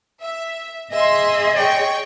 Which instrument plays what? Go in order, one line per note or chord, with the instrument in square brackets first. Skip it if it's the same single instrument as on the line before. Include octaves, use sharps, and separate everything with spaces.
[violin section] E5
[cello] G#4 D#5 [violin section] E5 C6
[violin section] C#5 G5 C#6